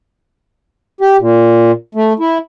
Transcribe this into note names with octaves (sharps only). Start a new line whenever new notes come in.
G4
A#2
A3
E4